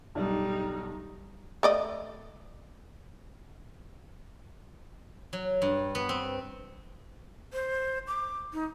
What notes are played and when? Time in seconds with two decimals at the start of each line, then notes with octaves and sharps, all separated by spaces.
0.15 B1 G2 G3 D#4 D5
1.63 A3 D5 D#5
5.33 F#3
5.62 G2
5.95 B3
6.09 C4
7.53 C5
8.08 D6
8.53 D#4